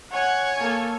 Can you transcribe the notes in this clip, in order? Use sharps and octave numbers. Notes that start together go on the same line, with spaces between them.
C#5 F#5 G#5
A#3 A4